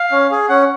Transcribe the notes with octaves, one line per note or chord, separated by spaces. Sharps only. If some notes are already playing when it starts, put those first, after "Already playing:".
Already playing: F5
C#4
G#4
C#4 F#5